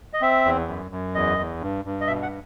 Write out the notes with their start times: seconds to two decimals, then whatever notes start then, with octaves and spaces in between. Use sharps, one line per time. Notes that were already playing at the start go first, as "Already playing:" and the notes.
0.13 D#5
0.21 C4 E5
0.45 E2
0.68 F#2
0.91 F#2
1.14 E2 D#5
1.38 E2
1.61 G2
1.85 G2
2.01 D#5
2.07 B2 E5
2.23 F#5